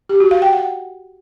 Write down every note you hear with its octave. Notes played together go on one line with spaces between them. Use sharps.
G4
F#4
F5
G5
F#5